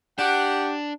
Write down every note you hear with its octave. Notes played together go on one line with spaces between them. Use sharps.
D4 G4 F#5